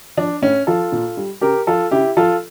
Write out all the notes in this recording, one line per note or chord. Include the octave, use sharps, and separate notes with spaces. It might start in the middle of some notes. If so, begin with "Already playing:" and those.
F3 D4
A2 C#4
F3 F4 A4
A#2
G3
C#3 G4 A#4
F3 F4 A4
C#3 E4 G4
F3 F4 A4